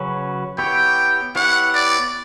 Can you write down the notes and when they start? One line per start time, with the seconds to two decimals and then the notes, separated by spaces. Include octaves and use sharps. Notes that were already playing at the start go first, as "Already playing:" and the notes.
Already playing: C#3 F#3 C#4 F#4 B4
0.58 B3 E4 G4 C#5 G5
1.35 B3 E4 G4 C#5 F#5
1.74 D5